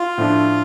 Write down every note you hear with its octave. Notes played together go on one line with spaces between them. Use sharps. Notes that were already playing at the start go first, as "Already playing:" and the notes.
Already playing: F4
A2 F3 A3 D4